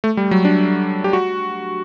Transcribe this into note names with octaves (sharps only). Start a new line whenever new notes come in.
A3
G3
F#3
D4
G4
F#4